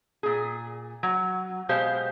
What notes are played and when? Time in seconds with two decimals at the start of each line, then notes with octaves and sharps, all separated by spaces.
0.23 A#2 G#4
1.03 F#3
1.69 B2 G#3 G4 C5 F5